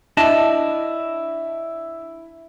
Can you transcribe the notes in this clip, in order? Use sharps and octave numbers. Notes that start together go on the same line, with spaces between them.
D4 E4 D#5 A5